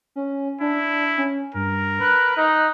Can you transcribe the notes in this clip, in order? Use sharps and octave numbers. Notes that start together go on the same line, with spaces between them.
C#4
D4 E4
C#4
G2 A#4
B4 F#6
D#4